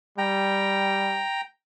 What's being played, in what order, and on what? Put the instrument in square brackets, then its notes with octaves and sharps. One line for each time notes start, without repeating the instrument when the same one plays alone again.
[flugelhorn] G3 [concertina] G5 A#5